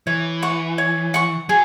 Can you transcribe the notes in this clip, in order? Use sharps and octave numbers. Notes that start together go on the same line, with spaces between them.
E3 C#5
F#5 C#6
C#5
F#5 C#6
F#3 G#4